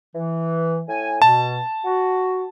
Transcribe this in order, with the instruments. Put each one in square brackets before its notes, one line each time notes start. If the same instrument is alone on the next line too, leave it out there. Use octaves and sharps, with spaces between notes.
[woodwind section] E3
A2 G#5
[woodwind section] B2 [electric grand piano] A5
[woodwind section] F#4